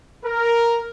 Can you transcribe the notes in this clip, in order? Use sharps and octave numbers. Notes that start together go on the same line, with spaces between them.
A#4